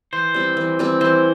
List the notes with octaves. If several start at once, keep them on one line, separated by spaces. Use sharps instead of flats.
E3 C5
G3 C4 E4
E3
G3 C4 E4
E3 C5